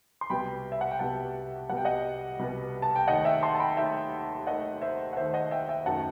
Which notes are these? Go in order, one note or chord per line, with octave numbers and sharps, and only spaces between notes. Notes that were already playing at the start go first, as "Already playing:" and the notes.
C6
C2 B2 G3 B3 G5 B5
E5
F#5
G5
C2 B2 G3 B3 F#5 A5
C2 B2 G3 B3 F#5
G5
D#5 F#5
C2 B2 G3 B3
A5
G5
D#2 D#3 A3 D#5 F#5
E5 G5
A5 C6
A5
G5 B5
D#2 D#3 A3 E5 G5
D#2 D#3 A3 D#5 F#5
C5 E5
F#5
D#2 D#3 A3 C5 E5
D#5 F#5
E5 G5
E5 G5
F#2 D#3 F#3 A3 F#5 A5